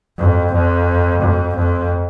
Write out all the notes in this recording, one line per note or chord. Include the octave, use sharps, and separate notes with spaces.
F2
F2
F2
F2